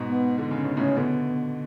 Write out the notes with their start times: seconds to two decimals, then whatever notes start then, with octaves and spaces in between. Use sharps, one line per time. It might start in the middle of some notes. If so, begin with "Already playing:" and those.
Already playing: G#2 B2
0.08 B3
0.38 D3
0.51 C#3
0.57 C#4
0.63 B2
0.77 A2 C#3 C#4
0.97 B2 D3 B3